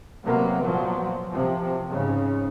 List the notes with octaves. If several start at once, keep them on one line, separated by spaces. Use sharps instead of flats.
C3 F#3 A#3 B3
A#2 F3 F#3
C3 F3
G#2 C#3